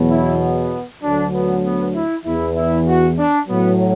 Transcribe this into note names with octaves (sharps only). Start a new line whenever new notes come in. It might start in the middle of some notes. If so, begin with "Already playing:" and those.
Already playing: E2 B2 F#3
E4
B3
D2 D3 F#3 D4
B3
B3
E4
E2 E3 E4
E4
F#4
D4
A2 F#3 B3